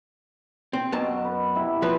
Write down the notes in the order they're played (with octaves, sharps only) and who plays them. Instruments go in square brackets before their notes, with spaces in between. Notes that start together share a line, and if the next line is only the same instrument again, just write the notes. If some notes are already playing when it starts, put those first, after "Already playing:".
[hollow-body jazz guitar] C4
[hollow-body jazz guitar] F#2 A5 [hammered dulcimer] B2
[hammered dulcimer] B4
C3 E4
[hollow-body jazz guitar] F3 B4